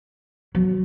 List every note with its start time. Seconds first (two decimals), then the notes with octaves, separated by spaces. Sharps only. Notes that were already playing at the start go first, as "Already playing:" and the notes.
0.55 F#3